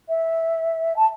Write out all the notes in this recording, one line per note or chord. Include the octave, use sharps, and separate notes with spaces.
E5
A5